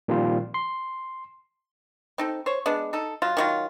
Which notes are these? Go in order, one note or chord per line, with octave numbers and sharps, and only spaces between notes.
A#2 D#3 F3 G3 C4 F4
C6
C4 D#4 A4
C5 C#5
G#3 B3 D4
D#4 A4
F#3 F4
D#3 F#3 F4